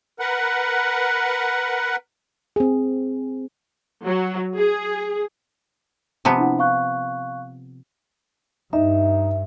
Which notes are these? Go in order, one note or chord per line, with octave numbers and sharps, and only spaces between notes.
A#4 B4 F#5
C4 G#4
F#3
G#4
C3 F3 B3
D4 E4 F#5
F5 C#6 F#6
G2 D#4 E5